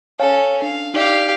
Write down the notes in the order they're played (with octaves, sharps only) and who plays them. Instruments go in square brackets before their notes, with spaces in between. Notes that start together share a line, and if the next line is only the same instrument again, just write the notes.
[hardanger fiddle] C#4 A4 [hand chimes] C#5 F5 G#5
[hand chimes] D4 [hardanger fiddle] F5
[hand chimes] D#4 D5 [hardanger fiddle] G4 F5